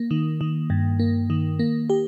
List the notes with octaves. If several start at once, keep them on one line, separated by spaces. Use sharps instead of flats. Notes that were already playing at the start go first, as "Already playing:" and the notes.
Already playing: A#3
D#3
D#3
G2
A#3
D#3
A#3
G4